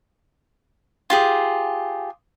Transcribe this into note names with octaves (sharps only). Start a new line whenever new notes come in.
F4 G4 G#4